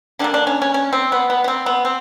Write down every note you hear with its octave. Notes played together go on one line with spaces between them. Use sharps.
D3 G3 A#3 D4
D4
C#4
C#4
C#4
C4
B3
B3
B3
C4
B3
C4